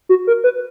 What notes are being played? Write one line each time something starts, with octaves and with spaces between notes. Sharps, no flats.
F#4
A#4
B4